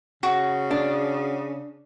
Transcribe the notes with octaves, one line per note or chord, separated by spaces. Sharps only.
C#3 F#4
D4